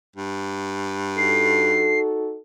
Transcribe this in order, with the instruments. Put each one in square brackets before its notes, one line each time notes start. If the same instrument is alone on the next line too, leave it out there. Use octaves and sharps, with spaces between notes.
[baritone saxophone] G2
[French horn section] D#4 F#4 A4 [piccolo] C7